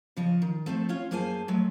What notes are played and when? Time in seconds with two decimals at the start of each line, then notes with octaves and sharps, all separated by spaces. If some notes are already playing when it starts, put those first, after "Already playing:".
0.17 C#3 F3 D#5
0.42 D#3
0.66 F3 A3 C4 A4
0.89 C#4 F4 C#5
1.11 F#2 A#3 G#4 C5 G#5 A5
1.48 F#3 G#3 A3